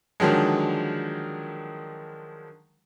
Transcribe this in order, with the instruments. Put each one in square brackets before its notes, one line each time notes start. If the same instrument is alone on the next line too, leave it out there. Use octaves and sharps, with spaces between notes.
[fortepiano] D3 D#3 F3 F#3 G#3